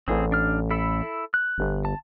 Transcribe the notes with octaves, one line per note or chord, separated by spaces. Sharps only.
A1 C4 G#4
D4 F6
E4 A4 B5
F#6
G1
A5